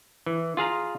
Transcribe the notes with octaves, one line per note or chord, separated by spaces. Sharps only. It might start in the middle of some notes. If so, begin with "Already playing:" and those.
E3
F4 G#4 F5 A#5